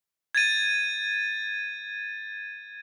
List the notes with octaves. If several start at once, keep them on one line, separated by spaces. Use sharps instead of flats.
G#6 A6 D#7